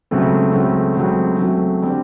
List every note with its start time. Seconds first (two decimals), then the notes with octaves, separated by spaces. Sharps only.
0.11 C#2 C#3 F#3 A3 C4
0.54 C#2 C#3 F#3 A3 C4
0.96 C#2 C#3 F#3 A3 C4
1.39 C#2 C#3 F#3 A3 C4
1.82 D3 G3 C4